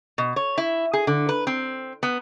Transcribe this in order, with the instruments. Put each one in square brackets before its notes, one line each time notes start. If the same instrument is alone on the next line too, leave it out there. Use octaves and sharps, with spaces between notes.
[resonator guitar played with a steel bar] B2
C#5
E4
G#4
D3
B4
C4
B3